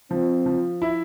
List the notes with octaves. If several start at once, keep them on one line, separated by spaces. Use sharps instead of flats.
F3 C4
F3
E4